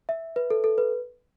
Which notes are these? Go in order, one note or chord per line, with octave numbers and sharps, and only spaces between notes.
E5
B4
A4
A4
B4